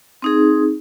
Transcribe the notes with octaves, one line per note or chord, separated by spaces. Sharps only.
C4 D#4 G#4